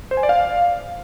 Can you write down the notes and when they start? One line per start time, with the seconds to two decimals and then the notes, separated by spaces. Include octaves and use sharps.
0.11 C5
0.17 G#5
0.23 D5
0.29 F5